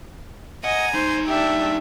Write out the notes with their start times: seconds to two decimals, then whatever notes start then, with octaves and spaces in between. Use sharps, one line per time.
0.64 D#5 F#5 G#5 A#5
0.94 G3 D#4 C5
1.27 D4 G4 E5